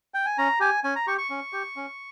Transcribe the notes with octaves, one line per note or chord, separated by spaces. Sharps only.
G5
G#5
C#4 A#5
G4 G#5
C#4 G#5
A#5
G4 C#6
C#6
C#4
G4
C#4